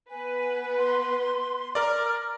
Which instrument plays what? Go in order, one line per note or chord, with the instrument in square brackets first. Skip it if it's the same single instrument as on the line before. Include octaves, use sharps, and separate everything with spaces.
[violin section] B3 B4 [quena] G#5
[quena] C6
[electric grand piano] A#4 D5 [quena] F6